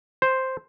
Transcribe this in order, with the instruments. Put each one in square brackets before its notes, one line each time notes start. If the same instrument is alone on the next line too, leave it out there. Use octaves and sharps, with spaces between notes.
[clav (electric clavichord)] C5